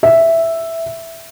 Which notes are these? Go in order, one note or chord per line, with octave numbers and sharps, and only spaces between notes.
E5